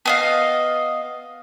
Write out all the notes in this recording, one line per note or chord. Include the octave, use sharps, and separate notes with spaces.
B3 D#5 F5